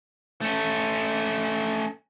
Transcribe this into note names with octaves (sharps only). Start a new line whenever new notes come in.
A3 C#4